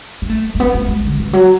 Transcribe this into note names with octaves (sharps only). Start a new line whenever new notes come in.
B3
A3
A3
B3
A3
G#3
D3
E3
F#3